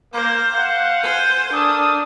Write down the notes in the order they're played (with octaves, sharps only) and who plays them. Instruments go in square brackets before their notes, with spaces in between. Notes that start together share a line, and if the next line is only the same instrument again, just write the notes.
[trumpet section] A#3 [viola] C5
[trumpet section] F5 F#5
[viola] C5 G#5
[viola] D4 [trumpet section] A4 A#4 D#6